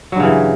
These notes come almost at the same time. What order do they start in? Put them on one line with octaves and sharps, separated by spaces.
F#3 G2 C#3 E3